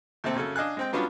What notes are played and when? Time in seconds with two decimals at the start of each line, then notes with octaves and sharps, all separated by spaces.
0.24 D#2 C3 A3 C4 A4
0.35 F#2 C#3 C#4 A4
0.56 D4 D#5 F5 G#5 F#6
0.77 G#3 C4 G5
0.93 F#3 G3 B3 C#4 D4 F4